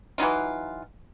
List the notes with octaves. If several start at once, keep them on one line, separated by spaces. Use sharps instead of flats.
E3 F#3 D#4 F4